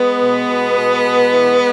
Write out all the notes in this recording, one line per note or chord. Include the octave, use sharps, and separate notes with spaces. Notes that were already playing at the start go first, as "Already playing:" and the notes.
Already playing: G#3 B3
B2
B2
B2
B2
E3